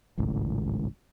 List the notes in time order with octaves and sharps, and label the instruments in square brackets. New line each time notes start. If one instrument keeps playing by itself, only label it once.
[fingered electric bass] D1 G#1 C#2 A2